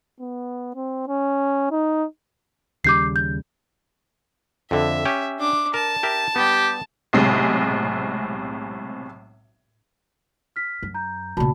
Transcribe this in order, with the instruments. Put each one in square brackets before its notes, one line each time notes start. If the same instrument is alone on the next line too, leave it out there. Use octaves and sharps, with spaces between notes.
[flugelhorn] B3
C4
C#4
D#4
[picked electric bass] D#2 C#3 G3 [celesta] D6 G6 C7
[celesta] G6
[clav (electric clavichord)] F2 D3 [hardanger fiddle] E5
[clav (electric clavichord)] C#4 G4
[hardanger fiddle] D4 D6
[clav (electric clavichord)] A#4 [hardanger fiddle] A5
[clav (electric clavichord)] G4 A#4 E5
[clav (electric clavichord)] G3 B3 [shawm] G4
[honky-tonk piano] B1 A2 C3 G#3
[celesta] F6 B6
[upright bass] F#2
[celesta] A#5 G6
[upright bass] A#2 C#3 [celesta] F#4 A5 B5